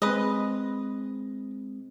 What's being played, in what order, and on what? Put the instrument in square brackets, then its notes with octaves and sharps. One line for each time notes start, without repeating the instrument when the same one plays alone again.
[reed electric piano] G#3 C4 [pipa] B4 D#5